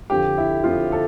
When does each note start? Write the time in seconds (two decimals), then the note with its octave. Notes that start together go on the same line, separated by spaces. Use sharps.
0.10 F2 D3 F3 G4
0.38 E4
0.64 F2 D3 F3 F4
0.92 A4